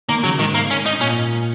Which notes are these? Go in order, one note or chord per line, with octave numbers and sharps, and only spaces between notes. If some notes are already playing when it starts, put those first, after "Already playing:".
D#3 A#3
C#3 F#3
G#2 D#3
A#3
C#4
D#4
A#2 C#4